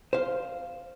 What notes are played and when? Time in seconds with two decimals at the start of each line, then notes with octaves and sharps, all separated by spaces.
0.13 C5 F5